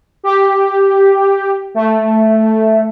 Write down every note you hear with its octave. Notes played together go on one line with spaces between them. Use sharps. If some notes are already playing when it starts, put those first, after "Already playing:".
G4
A3